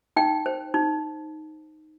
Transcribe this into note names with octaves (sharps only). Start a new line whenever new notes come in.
D#4 G5
C5
D#4